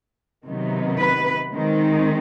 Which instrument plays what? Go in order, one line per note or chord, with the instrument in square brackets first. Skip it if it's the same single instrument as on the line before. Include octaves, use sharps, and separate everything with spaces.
[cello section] C3 D#3 F#3 B3 D#4
B4
D#3 G#3 C4 D#4